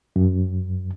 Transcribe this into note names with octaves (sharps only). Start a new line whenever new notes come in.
F#2